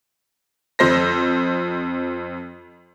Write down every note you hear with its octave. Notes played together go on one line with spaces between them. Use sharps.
F2 C5 A#6